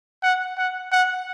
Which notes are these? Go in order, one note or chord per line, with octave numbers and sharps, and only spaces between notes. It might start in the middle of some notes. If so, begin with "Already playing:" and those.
F#5
F#5
F#5